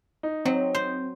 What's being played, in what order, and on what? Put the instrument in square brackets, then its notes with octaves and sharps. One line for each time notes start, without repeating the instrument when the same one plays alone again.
[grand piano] D#4
[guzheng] F#3 [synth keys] C4
[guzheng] C5